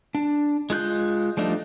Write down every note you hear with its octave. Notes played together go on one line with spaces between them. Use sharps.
D4
G#3 F4 F#6 G6
F3 G3 A3 D4 D#4